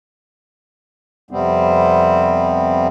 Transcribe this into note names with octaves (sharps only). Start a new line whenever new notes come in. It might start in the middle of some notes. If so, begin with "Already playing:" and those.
F2 C3 G3 B3 C4